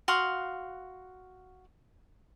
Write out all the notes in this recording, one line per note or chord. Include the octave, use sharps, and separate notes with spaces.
F#4 F5 C6 D#6